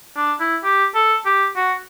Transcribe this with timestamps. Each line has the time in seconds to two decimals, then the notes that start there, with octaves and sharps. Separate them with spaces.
0.17 D4
0.40 E4
0.63 G4
0.95 A4
1.25 G4
1.56 F#4